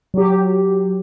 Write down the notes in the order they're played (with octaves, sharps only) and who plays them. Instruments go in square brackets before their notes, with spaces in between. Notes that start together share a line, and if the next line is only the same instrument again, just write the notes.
[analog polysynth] F#3 G4